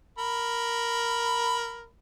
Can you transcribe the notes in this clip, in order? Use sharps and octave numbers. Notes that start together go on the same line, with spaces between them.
A#4 B5